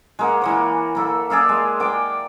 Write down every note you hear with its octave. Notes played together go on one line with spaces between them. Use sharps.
G#3 A#3 F#5
E3 A#3 C#5
A#3 A4 E5
G#4 D5 E5 F5
G#3
D5 G5 D6